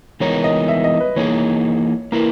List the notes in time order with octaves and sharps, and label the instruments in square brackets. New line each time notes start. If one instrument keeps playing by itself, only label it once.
[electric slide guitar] E3 G#3 B3 D#4 A#4 [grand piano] C#5
[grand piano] D#5
E5
D#5
B4
[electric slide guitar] E3 A#3 D#4 G#4 [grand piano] C#5
[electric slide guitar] A#3 E4 B4 [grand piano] A#4